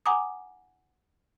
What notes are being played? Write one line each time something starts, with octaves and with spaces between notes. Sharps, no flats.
F#5 G#5 A#5 D6 D#6